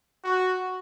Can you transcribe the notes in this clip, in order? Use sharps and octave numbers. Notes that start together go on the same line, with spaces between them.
F#4